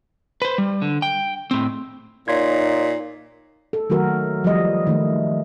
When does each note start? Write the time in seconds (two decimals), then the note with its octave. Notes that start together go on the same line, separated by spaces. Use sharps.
0.42 B4 C5
0.58 G3
0.82 D3
1.02 G5
1.51 A2 C4
2.28 A#2 D#4 C#5 C6 G#6
3.73 A4
3.90 D#3 F#3 A3 F#4 A#4
4.44 F3 G3 D#5
4.87 D#3 A3